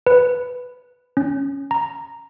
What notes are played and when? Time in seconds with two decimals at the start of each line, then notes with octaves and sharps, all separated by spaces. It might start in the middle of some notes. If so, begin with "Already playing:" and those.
0.07 B4
1.17 C#4
1.71 A#5